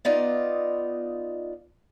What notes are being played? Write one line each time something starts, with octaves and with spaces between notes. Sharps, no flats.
B3 D#4 F4 D5